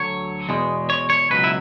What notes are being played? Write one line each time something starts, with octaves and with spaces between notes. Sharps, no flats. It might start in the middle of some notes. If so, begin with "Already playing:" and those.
Already playing: D2 D3 F#3 C#5
E2 B2 G#3
C#5
C#5
C#2 B2 F#3 B4
E4